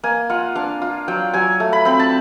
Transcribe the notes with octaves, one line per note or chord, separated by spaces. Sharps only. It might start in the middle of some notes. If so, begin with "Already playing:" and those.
A#3 G#5
F4 F#5
D4 F5
F4
F#3 G5
F#3 G#5
A3
B5
C4 B5
A5